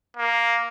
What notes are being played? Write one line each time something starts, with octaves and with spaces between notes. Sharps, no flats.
A#3